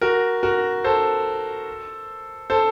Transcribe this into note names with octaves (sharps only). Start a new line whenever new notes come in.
F#4 A#4
F#4 A#4
A4 C5
A4 C5